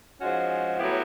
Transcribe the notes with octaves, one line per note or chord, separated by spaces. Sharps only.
G#2 F3 G#3 C#4 F#4
A2 F#3 B3 E4 G4